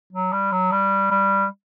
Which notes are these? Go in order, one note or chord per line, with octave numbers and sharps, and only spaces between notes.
F#3
G3
F#3
G3
G3